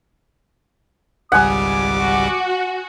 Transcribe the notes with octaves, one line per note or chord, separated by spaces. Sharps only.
G#1 C#2 G3 F#5 G#5 D6 D#6
F#4